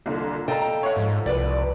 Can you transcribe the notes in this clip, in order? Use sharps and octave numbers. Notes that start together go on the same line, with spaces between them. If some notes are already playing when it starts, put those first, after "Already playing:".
C2 A#2 D3
A4 D#5 F5 G5 A#5
C#5 E5 F#5
G#2 F3
C2 B4 D5